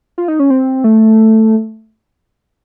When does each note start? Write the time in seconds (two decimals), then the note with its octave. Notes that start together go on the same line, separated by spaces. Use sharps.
0.18 F4
0.28 D#4
0.39 C#4
0.50 C4
0.84 A3